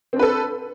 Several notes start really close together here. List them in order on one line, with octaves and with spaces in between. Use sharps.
C4 D4 B4 A4